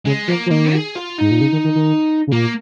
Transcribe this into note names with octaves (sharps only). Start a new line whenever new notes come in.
C#3 G#3
F3 A#3
F3
D#3 A#3
G#4
F4
G#2 D#4
A#2
C#3
D#3
D#3
D#3
C#3
A#2 A#3